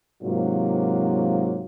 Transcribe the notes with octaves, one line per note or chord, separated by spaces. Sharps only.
G#2 C3 F#3 A#3 F4 F#4